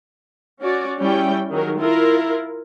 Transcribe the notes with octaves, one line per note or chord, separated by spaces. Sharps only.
C#4 F#4 D5
G3 C#4 E4 G5
D#3 F#3 G#4 A#4
E4 F4 A#4